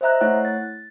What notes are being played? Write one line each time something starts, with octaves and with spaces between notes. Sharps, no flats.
C5 D#5 E5 A#5 F#6
A3 E4 C#5 F#5 F#6
A6